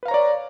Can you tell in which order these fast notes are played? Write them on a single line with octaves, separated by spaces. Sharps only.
B4 F5 A#5 C#5 D5